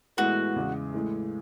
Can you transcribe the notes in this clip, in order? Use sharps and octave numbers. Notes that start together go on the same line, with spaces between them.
A2 E3 G#3 B3 F#4
E2 C#3 G#3
A2 E3 G#3